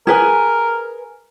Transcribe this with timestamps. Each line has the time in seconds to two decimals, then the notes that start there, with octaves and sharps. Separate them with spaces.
0.07 G#4 A#4 B4 G#5